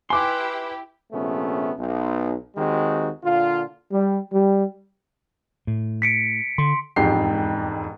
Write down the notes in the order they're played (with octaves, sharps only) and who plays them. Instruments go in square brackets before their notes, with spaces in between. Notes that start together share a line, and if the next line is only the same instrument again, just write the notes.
[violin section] E4 G4 E5 [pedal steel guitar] B4 C6 [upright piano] G#5 D6
[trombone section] A#1 C3 A3 B3 C#4
B1
D#2 D#3 G#3 C4 F#4
A#2 D3 F4
G3
G3
[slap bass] A2
[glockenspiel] B6 C#7 D7
[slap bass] D3 [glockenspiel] C6
[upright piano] E1 F2 G#2 G4 G5 C7